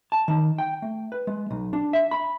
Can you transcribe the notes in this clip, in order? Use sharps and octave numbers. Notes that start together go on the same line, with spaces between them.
A5
D#3
G5
A3
B4
G#3
B1
D4
E5
B5